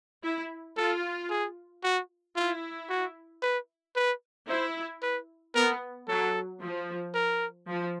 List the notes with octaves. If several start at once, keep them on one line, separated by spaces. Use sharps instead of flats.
E4
F4 A4
G#4
F#4
E4 F4
F#4
B4
B4
E4 C5
B4
B3 A#4
F#3 A4
F3
A#4
F3